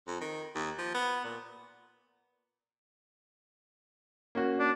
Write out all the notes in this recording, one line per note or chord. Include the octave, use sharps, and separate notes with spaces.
F2
D#3
D#2
F3
B3
A#2
A#3 C#4 F#4
D4